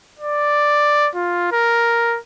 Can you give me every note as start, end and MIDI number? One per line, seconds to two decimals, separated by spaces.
0.19 1.09 74
1.15 1.47 65
1.52 2.18 70